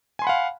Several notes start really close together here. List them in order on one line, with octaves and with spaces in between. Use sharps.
G#5 C6 B5 F#5 F5